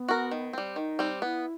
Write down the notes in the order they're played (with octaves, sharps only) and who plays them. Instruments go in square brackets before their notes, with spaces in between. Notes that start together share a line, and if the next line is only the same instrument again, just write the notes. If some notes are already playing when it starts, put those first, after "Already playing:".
Already playing: [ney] B3
[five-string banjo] F#4 A#4
D#3
G3 C4
[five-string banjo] D#3 [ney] D#4
[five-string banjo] G3 C4
[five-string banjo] B3 [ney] E4